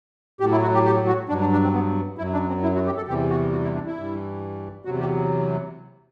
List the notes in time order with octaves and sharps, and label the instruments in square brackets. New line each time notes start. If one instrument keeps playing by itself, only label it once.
[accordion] A2 F#3 G4
E4
F#4
G4
G4
F#4
G2 F#3 D4
D4
D4
C4
B3
F#2 F#3 E4
D4
C4
E4
F#4
G4
A4
E2 C3 E3 G3 G4
F#4
F#4
E4
D4
E4
G2 E3 G3
E2 C3 F#3 F#4
G4